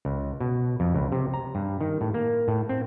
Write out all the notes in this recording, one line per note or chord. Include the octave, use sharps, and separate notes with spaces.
C#2
B2
F2
C#2
C3
A#5
G2
D#3
A2
A#3
A2
C4